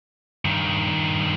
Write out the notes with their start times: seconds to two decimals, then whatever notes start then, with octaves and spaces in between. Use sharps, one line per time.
0.45 G2 D#3